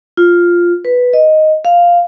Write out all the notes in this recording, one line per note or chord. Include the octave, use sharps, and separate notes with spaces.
F4
B4
D#5
F5